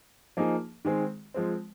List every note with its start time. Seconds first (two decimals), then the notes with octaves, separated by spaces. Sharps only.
0.37 F3 A#3 D#4 G#4
0.85 D#3 G#3 C4 G#4
1.34 F3 G#3 C4